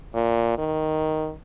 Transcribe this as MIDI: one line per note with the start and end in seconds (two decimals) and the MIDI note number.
0.14 0.53 46
0.58 1.32 51